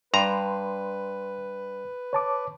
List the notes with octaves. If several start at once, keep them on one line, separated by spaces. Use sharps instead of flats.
G2 B4 A#5 C6
C#5 A5 D6